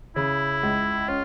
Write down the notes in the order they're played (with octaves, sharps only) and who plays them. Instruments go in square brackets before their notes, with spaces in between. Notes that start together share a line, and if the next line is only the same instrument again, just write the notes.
[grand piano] C#3 [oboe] E4
[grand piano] C#2
[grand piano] C#4 [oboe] F4